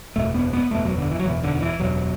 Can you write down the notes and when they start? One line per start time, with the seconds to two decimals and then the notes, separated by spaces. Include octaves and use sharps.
0.16 F#1 E2 B2 A3
0.34 B3
0.53 B3
0.70 F#1 E2 B2 A3
0.85 F#3
0.98 D3
1.11 E3
1.19 F#3
1.25 F#1 E2 B2 E3
1.43 D3
1.55 D3
1.62 E3
1.79 F#1 E2 B2 F#3